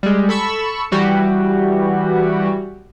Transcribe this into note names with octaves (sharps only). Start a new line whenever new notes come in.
G3 G#3
A4 B5 C#6 E6
E3 G3 F#4 G4